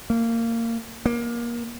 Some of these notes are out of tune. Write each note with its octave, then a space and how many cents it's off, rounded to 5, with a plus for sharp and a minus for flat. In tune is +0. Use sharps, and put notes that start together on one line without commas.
A#3 -20
A#3 +25